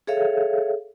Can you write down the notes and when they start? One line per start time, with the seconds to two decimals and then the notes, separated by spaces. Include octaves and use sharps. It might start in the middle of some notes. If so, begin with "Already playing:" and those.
0.07 G#4 A4 C#5 E5 F5